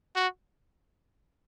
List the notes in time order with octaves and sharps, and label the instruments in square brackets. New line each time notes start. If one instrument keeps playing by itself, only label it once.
[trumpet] F#4